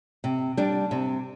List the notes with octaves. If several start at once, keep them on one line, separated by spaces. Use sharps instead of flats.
C3
G3 D4
C3